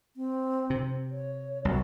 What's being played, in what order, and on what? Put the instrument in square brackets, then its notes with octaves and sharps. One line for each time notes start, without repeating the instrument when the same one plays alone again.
[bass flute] C4
[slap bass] C3
[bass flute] C#5
[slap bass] C2 [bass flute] F#3